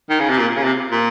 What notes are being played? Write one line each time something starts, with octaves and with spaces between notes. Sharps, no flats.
D#3
C#3
C3
A#2
C#3
C3
A#2